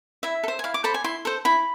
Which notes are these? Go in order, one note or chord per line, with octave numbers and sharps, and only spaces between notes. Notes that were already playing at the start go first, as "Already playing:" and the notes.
E4 E5
A4
C5
G#5
E4 F5
D6
A4 C5 B5
G#5
E4 C6
A4 C5
E4 B5